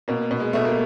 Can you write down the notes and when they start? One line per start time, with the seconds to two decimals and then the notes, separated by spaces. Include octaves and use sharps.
0.08 B2 A#3
0.31 B2
0.40 G#3
0.53 B2 A3
0.65 A#3